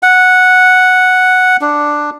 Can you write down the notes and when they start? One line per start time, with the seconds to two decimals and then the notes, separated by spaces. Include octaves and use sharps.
0.03 F#5
1.61 D4